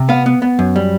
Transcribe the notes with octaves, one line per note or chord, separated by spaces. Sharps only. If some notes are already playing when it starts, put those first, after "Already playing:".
Already playing: C3
B3 F5
B3
B3
F#2
G3